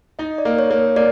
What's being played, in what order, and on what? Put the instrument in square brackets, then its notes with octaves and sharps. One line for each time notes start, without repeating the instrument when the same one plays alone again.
[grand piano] D#4 [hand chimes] D#5
[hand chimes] D5
[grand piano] A#3
[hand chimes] C#5
[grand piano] A#3
[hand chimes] C#5
[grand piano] A#3 [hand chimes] D5